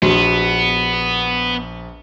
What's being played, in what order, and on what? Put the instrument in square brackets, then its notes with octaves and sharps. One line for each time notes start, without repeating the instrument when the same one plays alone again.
[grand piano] A#1 [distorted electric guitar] B3 [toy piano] F#4